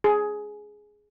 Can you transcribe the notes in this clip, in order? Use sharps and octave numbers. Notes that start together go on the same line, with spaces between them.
G#4